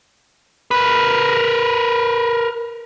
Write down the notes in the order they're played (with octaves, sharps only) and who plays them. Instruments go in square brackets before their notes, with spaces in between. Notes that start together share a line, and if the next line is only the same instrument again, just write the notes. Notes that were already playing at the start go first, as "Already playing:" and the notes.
[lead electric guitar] A#4 B4